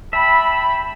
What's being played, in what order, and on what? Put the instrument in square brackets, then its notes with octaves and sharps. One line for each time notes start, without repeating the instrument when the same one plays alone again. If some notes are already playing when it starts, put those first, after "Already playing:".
[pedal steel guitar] E5 [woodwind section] G5 A5 B5